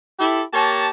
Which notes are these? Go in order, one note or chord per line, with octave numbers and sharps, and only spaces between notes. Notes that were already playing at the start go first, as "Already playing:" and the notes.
E4 G4 A4
A#3 G4 C#5 A5